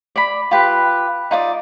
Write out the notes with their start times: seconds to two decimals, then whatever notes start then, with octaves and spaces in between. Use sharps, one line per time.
0.16 D5 B5
0.51 F4 G4 B4
1.31 D#4 F4 D5